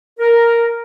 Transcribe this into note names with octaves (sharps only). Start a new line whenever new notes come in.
A#4